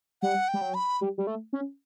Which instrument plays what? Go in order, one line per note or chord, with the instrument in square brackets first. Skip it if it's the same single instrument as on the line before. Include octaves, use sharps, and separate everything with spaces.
[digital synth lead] G3 [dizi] F#5
[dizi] G5
[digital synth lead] G3
F#3
[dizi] B5
[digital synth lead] G3
G3
A3
C#4